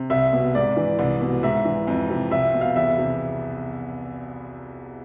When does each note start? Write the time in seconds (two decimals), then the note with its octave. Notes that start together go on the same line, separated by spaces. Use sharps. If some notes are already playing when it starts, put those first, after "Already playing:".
Already playing: C3
0.10 C2 E5
0.33 B2
0.55 G#2 D5
0.77 E3
0.99 C2
1.21 B2
1.43 G#2 E5
1.65 E3
1.87 F2
2.10 C3
2.31 C2 E5
2.54 B2
2.61 F5
2.76 E2 E5
2.98 C3